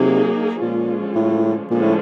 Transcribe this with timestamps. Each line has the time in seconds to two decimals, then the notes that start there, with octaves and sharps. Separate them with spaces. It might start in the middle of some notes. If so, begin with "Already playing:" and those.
Already playing: C3 F#3 A#3 D#4 G#4
0.61 A#2 D3 F3 G#3 C#4 F4
1.16 A2
1.70 A#2 D3 F3 G#3 C#4
1.82 A2